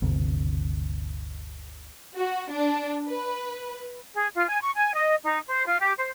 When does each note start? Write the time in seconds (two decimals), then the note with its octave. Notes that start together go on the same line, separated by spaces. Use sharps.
0.02 G1 D2 C3
2.17 F#4
2.50 D4
3.09 B4
4.14 G#4
4.35 F4
4.48 G#5
4.62 C#6
4.75 G#5
4.94 D#5
5.24 D#4
5.48 C5
5.66 F4
5.80 G4
5.97 C5